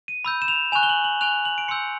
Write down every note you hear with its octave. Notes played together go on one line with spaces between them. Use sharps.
D#7
B5 E6 G6
E7
F7
G#5 C#6 F#6 F7
G7
F#7
F#7
G#5 C#6 F#6 F7
F#7
D7
C6 E6 G6 C#7